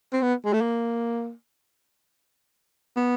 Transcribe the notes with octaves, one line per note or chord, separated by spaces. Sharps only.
C4
B3
G#3
A3
A#3
B3